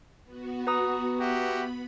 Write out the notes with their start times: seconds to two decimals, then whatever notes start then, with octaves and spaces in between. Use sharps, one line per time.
0.24 B3 F#4
0.67 B4 A#5 D#6
1.19 B3 F#4 G4 E5 B5